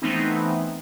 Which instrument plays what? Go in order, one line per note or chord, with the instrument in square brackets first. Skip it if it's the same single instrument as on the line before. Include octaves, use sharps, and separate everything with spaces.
[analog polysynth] E3 A3 B3 C4 D#4